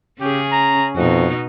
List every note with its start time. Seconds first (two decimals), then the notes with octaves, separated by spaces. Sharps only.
0.20 C#3 C#4 G4 G#4
0.52 A#5
0.96 F2 B2 D#4 F#4